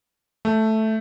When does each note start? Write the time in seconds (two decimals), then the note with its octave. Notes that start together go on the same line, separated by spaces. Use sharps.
0.45 A3